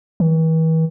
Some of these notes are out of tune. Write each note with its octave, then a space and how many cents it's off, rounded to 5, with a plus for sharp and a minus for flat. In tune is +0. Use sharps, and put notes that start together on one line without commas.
E3 -40